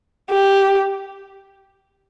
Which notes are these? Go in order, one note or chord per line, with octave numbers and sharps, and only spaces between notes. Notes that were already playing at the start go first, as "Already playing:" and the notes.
G4